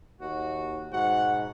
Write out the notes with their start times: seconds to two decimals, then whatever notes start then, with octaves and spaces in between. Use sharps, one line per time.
0.21 D#2 F#4
0.93 G#2 B2 F#4 F#5